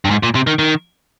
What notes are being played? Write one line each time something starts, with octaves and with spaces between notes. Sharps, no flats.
G2
G#2
A#2
C3
D#3
D#3